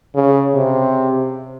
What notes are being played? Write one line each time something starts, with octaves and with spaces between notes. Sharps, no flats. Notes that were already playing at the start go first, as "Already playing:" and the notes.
C#3
C3